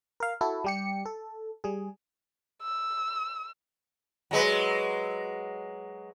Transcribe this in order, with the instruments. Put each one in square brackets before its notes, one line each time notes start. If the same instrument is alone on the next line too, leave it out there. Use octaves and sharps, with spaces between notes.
[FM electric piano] A#4 F5
E4 F#4 A4
G3 G4 C#7
A4
G3 G#4
[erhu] E6
[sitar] F#3 G#3 B4